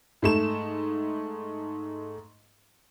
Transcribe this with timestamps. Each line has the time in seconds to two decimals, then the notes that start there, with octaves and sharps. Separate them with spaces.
0.22 G#2 A3 E7